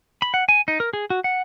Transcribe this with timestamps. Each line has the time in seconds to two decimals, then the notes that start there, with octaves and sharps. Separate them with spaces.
0.22 B5
0.34 F#5
0.49 G#5
0.68 D#4
0.80 A#4
0.93 G#4
1.10 F#4
1.24 F#5